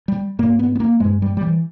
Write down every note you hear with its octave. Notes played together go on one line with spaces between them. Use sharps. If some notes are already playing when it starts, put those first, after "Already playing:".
G3
G#2 A#3
B3
B3
A#3
G2 G#3
G3
G3
E3